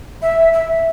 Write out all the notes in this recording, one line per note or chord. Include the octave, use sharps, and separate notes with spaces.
E5
E5